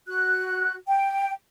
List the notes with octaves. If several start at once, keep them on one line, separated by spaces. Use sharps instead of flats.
F#4 F#6
G5